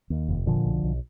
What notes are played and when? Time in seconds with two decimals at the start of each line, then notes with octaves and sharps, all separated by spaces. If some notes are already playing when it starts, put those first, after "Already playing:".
0.10 D#2
0.29 F1
0.47 A#2 D3 F3
0.65 B1
0.83 B1